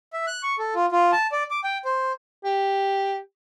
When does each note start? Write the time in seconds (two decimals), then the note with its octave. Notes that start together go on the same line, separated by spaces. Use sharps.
0.13 E5
0.27 F#6
0.43 C#6
0.59 A4
0.75 F4
0.92 F4
1.12 A5
1.32 D5
1.50 D6
1.64 G5
1.85 C5
2.45 G4